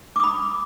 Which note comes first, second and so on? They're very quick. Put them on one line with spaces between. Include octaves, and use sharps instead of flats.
D6 D#6 B5